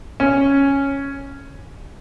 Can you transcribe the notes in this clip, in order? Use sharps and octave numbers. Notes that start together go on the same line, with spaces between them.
C#4